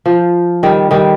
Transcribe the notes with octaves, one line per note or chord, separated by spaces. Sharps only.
F3
D#3 G3
D#3 G3